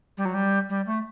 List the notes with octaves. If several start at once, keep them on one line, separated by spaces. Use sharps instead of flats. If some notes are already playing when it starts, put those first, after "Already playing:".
G3
F#3
G3
G3
A3